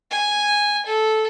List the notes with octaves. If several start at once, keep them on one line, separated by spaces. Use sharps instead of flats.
G#5
A4